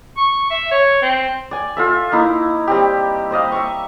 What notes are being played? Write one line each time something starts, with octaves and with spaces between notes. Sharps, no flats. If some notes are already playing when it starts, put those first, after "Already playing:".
C#6
E5
C#5
C4
D5 G#5
F4 A4 E5
A#3 D#4 E4
G3 C4 G4
C5 D5 D#5 F5
E5 C#6